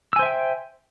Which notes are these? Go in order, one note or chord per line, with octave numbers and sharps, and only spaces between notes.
C5 E5 G5 G#5 E6